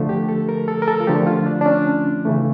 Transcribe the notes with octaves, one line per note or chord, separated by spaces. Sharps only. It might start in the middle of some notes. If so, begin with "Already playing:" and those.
Already playing: D3 F3 A3
G4
A4
A#4
A4
A#4
A4
F4
D3 F3 A3 G4
F4
D4
D4
C#4
C#3 E3 A3